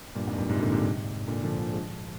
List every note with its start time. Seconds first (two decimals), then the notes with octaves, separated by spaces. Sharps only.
0.15 G2 A#2
0.27 F2 G#2
0.38 G2 A#2
0.49 G#2 C3
0.60 A#2 D3
0.72 G#2 C3
1.28 A#2 D3
1.44 D3 F3
1.59 D3 F3
1.73 F3 G#3